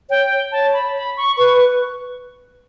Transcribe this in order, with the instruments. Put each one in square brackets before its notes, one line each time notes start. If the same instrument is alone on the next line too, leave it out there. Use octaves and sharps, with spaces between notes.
[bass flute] C#5 [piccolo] G5
[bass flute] C#5 [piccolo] A5
[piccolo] B5
B5
C#6
[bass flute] B4 [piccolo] C#6